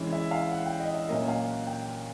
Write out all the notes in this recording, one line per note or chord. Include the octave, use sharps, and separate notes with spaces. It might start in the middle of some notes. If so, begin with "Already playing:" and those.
Already playing: E3 G#3 C#4
E5
F5
F#5
G5
D#5
E5
A#2 F#3 A#3 C#4 D#5
F5
F#5
G5